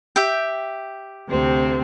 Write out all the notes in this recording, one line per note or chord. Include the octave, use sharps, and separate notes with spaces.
G4 E5 G5
D2 C3 C4